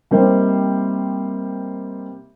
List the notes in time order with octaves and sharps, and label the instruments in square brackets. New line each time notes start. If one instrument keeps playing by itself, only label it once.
[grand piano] C3 G3 A#3 D#4 A#4 C5